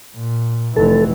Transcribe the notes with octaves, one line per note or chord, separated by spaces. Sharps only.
A#2
F1 E3 A4